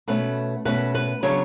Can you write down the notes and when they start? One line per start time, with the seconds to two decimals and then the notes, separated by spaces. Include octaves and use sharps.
0.08 B2 A3 C#4 B4
0.65 B2 A3 C#4 B4
0.95 B4
1.23 C#3 F#3 B3 D4 C#5